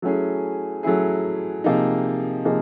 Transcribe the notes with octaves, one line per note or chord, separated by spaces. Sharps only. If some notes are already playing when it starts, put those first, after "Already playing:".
F#3 A3 C#4 E4 G#4
F#3 A3 C#4 E4 G#4
C3 F3 A#3 D#4 G#4
C3 F3 A#3 D#4 G#4